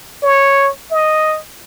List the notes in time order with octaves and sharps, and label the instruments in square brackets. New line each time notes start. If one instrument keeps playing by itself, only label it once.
[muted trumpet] C#5
D#5